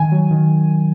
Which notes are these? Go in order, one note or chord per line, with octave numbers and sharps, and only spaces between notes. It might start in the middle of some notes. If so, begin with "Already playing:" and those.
Already playing: D#3 G#5
F#3
D#3